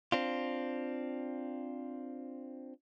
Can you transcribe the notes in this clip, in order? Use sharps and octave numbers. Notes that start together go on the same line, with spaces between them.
C4 D4 F4